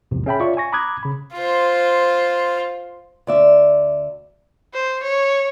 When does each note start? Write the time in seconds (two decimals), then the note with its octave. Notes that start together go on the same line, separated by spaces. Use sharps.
0.11 A#1 E2 G#2 C3
0.26 C#4 G#4 E5 G5 A5 B5
0.40 F4 C#5 D5 E5 C#6
0.57 G#5 C#6 A#6
0.72 A#5 B5 D6 D#6 F#6 G#6
1.03 C#3 B5
1.34 F4 C5
3.27 D2 D5 E5
4.74 C5
5.03 C#5